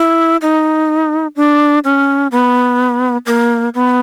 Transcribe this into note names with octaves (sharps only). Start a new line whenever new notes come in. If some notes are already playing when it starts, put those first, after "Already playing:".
Already playing: E4
D#4
D4
C#4
B3
A#3
B3